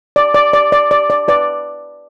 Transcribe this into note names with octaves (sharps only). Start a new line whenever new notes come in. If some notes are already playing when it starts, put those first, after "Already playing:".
D5
D5
D5
D5
D5
D5
B4 D5